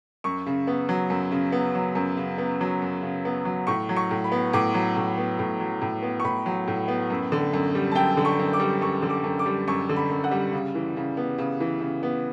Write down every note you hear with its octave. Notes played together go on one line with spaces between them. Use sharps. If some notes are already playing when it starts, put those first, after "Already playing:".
F#2 C#6
C#3
B3
F#3
F#2
C#3
B3
F#3
F#2
C#3
B3
F#3
F#2
C#3
B3
F#3
A2 C#6
F#3
C#6
A2
B5
B3
A2 D6
F#3
A2
B3
A2
F#3
A2
B3
C#6
A2 B5
F#3
A2
B3
F#2
D3
F#2
G3
A5
F#2 G5
D3
C#6
F#2
D6
G3
F#2 C#6
D3
D6
F#2
D6
G3
F#2 C#6
D3
B5
F#2
F#5
G3
C#3
E3
C#3
B3
C#3
E3
C#3
B3